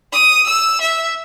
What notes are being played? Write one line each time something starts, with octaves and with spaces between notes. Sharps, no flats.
D#6
E6
E5